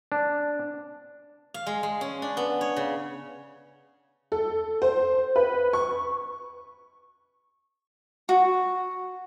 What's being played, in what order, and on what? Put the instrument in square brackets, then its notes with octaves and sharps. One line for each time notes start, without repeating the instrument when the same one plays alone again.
[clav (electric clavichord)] D4
[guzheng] F5
G#3
G#3
C#4
D4
B3
C#5
C#3
[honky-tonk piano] A4
C5
B4
C#6
[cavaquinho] F#4